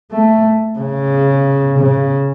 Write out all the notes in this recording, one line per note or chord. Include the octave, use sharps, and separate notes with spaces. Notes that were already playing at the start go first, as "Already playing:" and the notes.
A3
C#3
C#3